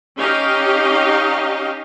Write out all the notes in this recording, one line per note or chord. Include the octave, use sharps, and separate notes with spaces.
C#4 D#4 G4 D#5 F5